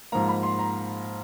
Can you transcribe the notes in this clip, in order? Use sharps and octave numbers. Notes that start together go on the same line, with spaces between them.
G#2 F3 A#3 A#5
B5
C6
A#5